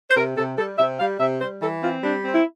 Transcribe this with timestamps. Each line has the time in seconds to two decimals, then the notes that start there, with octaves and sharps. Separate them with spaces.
0.10 C5
0.16 C3 A#4
0.37 C3 A4
0.58 G3 A4
0.78 C3 E5
1.00 G3 F5
1.20 C3 E5
1.41 G3 C5
1.62 E3 A4
1.83 C4 F4
2.03 G3 D4
2.24 C4
2.35 E4